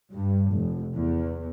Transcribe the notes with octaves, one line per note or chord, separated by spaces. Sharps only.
G2
F1
E2